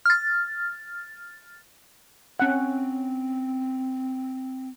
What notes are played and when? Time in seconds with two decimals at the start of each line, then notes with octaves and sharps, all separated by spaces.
0.06 F6 A6
2.40 C4 C#4 F#5